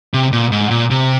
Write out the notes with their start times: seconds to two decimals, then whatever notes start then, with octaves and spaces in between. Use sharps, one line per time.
0.14 C3
0.32 A#2
0.51 G#2
0.70 A#2
0.91 C3